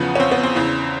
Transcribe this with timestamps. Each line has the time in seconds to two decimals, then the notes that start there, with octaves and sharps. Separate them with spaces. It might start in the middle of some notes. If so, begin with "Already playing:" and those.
Already playing: E2 C#3 F3 B3
0.15 C#4
0.20 C4
0.32 B3
0.43 C4
0.55 E2 C#3 E3